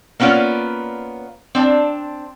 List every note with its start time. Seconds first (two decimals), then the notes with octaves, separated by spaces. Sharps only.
0.20 A#3 B3 C#4 F4 D5
1.55 C4 D4